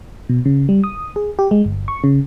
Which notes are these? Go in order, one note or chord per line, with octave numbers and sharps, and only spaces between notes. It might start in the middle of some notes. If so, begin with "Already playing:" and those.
B2
C#3
G3
D#6
G#4
G4
G#3
G1
C#6
C#3